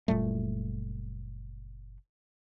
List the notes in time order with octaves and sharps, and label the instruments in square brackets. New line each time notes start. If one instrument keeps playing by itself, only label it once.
[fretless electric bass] F#1 A#2 G3 A3